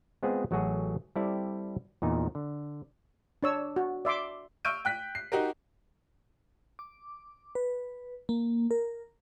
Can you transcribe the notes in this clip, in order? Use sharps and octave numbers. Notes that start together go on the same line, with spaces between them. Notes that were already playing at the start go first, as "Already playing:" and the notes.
G#3 B3 C4 F4 G#4
A1 F#3 A3 F#4 G#4
G3 C4 E4 G4 A4 D5
E2 A#2 D#4
D3
D4 C#5 E6
F#4
D5 E5 C6 D6
C#6 E6 F6 G6 D7 D#7
G5 F#6 B6
C7
D#4 F#4 G4 A#4
D6
B4
A#3
A#4